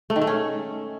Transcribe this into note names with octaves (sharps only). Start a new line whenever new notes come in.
A3
D#3
A3
C#4